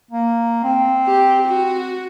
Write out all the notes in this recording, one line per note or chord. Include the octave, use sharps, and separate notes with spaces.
A#3
C4
G4
F#4